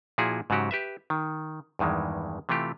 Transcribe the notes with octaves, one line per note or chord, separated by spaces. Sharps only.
A#2 F3 E4 F#4 G#4
G#2 C#3 F#3 F#4 G4
G4 B4 E5
D#3
E2 G2 D#3 E3 G#3
C3 E3 A3 F4 G4